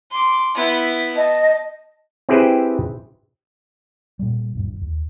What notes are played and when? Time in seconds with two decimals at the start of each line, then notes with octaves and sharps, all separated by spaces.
0.11 C6 D6
0.55 B3 E4
1.17 D#5 A5
2.29 C4 E4 G4 G#4 B4 C5
4.19 A#2 G3
4.55 D1 G2
4.81 D#2